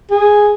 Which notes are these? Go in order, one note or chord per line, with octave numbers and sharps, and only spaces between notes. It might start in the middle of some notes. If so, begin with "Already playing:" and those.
G#4